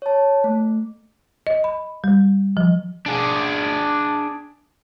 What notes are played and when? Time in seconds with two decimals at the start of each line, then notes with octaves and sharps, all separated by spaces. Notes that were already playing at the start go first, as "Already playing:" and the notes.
0.02 C#5 A5
0.44 A3
1.47 D#5
1.64 B5
2.04 G3
2.57 F3
3.06 D4 G#4